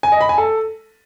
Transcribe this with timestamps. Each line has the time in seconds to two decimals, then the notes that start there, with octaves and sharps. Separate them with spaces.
0.03 G#5
0.12 D#5
0.21 B5
0.29 G#5
0.38 A4